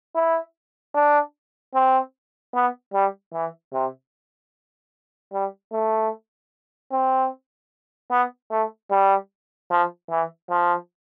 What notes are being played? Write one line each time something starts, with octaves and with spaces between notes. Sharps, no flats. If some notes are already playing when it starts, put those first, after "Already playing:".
E4
D4
C4
B3
G3
E3
C3
G3
A3
C4
B3
A3
G3
F3
E3
F3